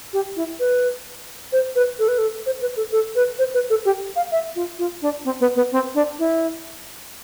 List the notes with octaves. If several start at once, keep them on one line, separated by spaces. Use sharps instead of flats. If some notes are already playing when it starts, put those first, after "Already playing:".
G4
E4
B4
C5
B4
A4
B4
A4
C5
B4
A4
A4
B4
C5
B4
A4
G4
F5
E5
F4
F4
D4
C4
B3
B3
C4
D4
E4